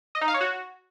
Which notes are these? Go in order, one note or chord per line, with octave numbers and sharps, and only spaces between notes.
D#5
D#4
F5
C#5
F#4